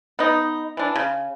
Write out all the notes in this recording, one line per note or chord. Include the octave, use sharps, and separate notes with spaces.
B3 D#4
E3 D4
C#3